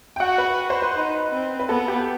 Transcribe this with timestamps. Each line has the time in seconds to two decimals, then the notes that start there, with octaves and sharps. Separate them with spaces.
0.16 G5
0.20 F#4 F#5
0.38 B4
0.70 C5
0.82 B4
0.94 D#4
1.32 C4
1.59 B4
1.69 B3 A4
1.88 G4